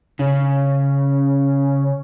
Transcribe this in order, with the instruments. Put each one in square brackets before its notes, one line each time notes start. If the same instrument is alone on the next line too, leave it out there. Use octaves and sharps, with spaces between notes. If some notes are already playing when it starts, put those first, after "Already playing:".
[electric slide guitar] C#3 [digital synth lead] C#4